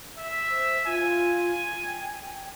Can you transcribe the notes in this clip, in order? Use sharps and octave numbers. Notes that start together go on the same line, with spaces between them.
E5
C5
F4 G#5
G5